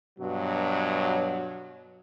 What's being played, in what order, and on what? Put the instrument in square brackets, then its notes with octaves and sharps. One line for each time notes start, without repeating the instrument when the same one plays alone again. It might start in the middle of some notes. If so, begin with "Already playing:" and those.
[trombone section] G2 B2 F#3